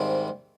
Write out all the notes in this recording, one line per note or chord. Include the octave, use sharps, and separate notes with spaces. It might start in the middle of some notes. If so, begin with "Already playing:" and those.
Already playing: G#2 D#3 G3 C4 E4